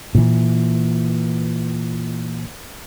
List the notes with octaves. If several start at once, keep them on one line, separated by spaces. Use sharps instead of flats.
A#2 E3